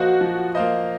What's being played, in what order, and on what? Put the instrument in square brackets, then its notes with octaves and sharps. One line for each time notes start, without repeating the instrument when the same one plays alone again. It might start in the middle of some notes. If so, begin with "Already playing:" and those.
Already playing: [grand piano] F3 A#3 F4 C5 D#5 [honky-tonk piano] F#4
[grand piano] F3
A#3 F4 C5 D#5